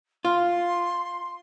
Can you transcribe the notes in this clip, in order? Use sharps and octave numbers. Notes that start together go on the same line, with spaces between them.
F4 C6